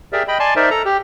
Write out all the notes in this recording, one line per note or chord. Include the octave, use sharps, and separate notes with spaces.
G4 G#4 A#4 D5 E5
D#5 G5 B5
D5 G#5 A5 C6
D#4 A#4 C5 D5 E5
A4 A#5
G4